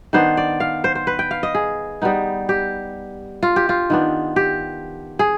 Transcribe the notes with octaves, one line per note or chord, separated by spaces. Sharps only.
D#3 B3 D4 C5
D5
F5
C5
C5
B4
G5
F5
D#5
G#4
G3 B3 D#4
G4
F4
G4
F4
D#3 B3 D4
G4
G#4